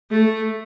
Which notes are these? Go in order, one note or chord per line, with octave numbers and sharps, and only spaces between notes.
A3